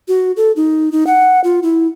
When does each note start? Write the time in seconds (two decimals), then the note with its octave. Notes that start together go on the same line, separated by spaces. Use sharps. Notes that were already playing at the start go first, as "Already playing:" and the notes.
0.08 F#4
0.37 A4
0.56 D#4
0.92 D#4
1.07 F#5
1.44 F4
1.63 E4